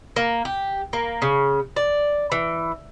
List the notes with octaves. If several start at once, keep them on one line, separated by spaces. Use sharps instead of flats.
A#3
G4
A#3
C#3
D5
E3